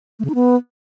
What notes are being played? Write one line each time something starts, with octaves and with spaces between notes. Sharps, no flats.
A3
C#3
D#4
B3